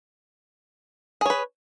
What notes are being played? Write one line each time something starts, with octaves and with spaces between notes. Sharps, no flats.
G#4 B4 C#5